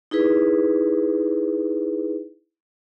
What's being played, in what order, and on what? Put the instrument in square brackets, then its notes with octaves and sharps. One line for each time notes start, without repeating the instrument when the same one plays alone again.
[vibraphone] D#4 E4 G#4 B4